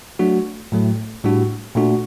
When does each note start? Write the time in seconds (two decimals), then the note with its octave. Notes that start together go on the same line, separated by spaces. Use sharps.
0.19 F#3 A3 D4 F#4
0.72 A2 F#3 A3
1.24 A2 G3 D4 F#4
1.75 A#2 A3 D4 F#4